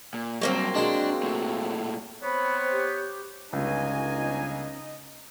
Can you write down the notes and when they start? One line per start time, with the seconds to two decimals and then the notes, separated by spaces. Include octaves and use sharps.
0.14 A#2
0.41 F#2 F#3 G3 A#3 C4
0.75 G#3 D4 F#4 C6
1.23 A#2 A3
2.23 B3 C4 C5 C#5 B5
2.71 G4
3.53 G1 C#2 C#4 D#4 D#5 G#5